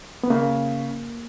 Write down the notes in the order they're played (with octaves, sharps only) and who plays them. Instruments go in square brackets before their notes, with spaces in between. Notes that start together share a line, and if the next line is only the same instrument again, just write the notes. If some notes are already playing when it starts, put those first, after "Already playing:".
[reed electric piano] B3
[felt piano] C#3 [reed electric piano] A#3